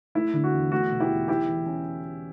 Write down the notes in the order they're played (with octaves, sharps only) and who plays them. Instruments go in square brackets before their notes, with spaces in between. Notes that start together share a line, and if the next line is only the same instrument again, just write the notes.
[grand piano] A3 [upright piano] E4
[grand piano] D3
[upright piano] F#4
[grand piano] E2
[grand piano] A3 [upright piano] F#4
[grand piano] B2
[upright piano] E4 G4
[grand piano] E2
[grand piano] G3 [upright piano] E4 G4
[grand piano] E3
C#4